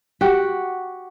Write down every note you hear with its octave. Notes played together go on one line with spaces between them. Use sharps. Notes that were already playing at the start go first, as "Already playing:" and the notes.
F#4 G4 F#5